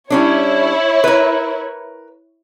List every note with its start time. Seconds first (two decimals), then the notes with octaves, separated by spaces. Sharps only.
0.10 G3 C#4 D4 E4 C#5
1.04 A#4 B4